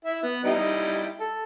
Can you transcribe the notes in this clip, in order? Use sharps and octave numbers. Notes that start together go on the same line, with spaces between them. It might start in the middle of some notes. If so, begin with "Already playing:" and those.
E4 E5
B3
G3 D#4 E4
A4